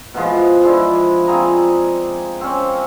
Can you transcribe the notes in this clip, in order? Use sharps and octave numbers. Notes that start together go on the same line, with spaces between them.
B2 E3 F3 G#3
F3 G#3 D4 E4
C4 F4 G#4 A#5
C4 C#4